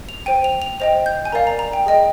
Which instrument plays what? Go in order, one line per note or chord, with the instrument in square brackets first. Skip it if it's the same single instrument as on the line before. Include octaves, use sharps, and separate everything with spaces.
[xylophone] F7
C5 G5 D#7
F7
F7
C5 D#5 G5 F7
G6
G#5
A#4 D5 F5 A#5
A#5
A#5
G5
G#4 D#5 G5